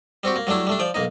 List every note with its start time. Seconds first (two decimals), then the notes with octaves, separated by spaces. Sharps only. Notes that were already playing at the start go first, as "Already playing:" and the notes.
0.23 G3 C4 F#4 G4
0.36 A#3
0.47 F#3 G3 A3 D4 E4
0.67 G3 A3 D4
0.79 F3 D5 G5
0.94 B1 A#3 D#4